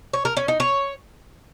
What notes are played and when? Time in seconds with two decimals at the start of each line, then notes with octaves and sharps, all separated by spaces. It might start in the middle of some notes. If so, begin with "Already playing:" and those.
0.13 C#5
0.25 A#4
0.37 C#4
0.48 D#4
0.60 C#5